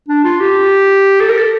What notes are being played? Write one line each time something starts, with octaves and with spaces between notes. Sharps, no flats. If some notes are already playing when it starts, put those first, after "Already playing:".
D4
F4
G4
A4
A#4
A4